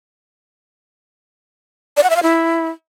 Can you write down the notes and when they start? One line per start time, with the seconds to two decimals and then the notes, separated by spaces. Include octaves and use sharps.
1.97 D5
2.03 F#5
2.10 E5
2.16 F5
2.23 E4